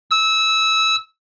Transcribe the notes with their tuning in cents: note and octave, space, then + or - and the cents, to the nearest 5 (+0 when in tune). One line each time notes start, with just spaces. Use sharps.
E6 -20